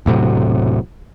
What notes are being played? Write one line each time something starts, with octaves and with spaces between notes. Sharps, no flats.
E1 A2 C3 F#3